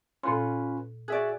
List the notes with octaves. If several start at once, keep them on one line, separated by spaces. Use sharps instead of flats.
A#2 C#4 F4 B4 C6
F#4 G#4 D5 E5 F#6